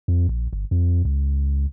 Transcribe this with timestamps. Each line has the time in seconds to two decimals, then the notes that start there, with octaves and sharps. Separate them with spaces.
0.08 F2
0.29 A#1
0.53 G1
0.71 F2
1.05 C#2